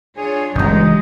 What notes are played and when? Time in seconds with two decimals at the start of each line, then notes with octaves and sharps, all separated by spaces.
0.17 D4 F4 G#4 C#5
0.56 G1 C#3 E3 F#3 G#3 A3 D#4